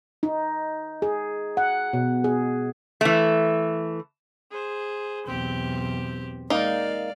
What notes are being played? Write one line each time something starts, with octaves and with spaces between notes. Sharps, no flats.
D#4
G#4
F#5
B2
G#4
E3 A3
G#4 C5
B1 E2 C4 G4
G#3 A#3 D#4 D5 F5